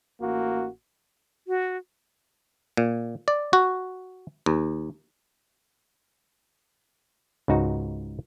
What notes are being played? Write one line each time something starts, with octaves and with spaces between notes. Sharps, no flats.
A1 A#3 F#4
F#4
A#2
D5
F#4
D#2
C#2 G#2 D#4 F#4